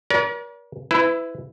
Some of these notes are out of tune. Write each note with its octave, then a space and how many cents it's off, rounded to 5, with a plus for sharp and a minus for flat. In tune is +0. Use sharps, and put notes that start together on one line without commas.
A#4 +45 D5 -45
E4 +0 B4 +35